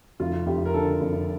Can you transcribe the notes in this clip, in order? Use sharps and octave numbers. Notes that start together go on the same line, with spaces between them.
F1 F4
F1 G4
A#4
D3 A4
F1